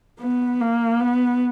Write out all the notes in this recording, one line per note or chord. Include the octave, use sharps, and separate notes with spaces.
B3
A#3
B3